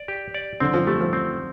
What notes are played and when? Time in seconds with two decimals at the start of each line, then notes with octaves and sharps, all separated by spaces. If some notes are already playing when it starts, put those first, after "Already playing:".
Already playing: D5
0.08 G4
0.34 D5
0.60 D3 C4
0.74 F3
0.87 G3 A3
1.00 F3
1.13 C4